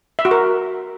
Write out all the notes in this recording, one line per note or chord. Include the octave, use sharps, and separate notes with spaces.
E5
F#4
A#4